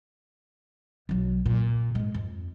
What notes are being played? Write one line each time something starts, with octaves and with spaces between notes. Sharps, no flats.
B1 F#3
A#2
G#2 G#3
F2